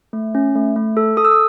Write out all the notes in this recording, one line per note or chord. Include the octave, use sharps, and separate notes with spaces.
A3
C#4
A3
A3
A4
A4 D#6
E6
D#6